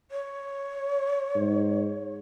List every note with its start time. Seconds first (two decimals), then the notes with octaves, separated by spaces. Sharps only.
0.11 C#5
1.36 G#2